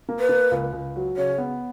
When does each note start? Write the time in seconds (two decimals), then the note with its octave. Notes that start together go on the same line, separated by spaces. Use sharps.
0.09 A#3
0.19 B4
0.29 A#3
0.51 C#2
0.73 C#2
0.96 F#3
1.17 C#3 C#5
1.38 B3